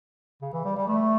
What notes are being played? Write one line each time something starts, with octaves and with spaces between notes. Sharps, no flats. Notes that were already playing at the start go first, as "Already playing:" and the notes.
C#3
E3
G3
G3
A3